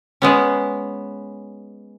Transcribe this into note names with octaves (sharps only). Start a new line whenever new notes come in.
G#3 B3 C#4